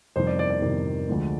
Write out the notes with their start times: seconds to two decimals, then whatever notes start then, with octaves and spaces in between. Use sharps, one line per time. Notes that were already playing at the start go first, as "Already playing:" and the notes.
0.16 F2 C3 D#3 G3 C5
0.27 D5
0.39 D5
0.50 D5
0.62 F2 C3 D#3 G3
1.09 D2 D3 F3 G#3